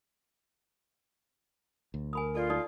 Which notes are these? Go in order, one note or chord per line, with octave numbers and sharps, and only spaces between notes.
D2
A#4 G#5 B5 D#6
F4 A4 D5
D#4 D5 D#6